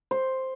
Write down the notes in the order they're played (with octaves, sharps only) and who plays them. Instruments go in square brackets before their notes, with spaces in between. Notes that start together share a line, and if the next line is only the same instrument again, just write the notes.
[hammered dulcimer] C5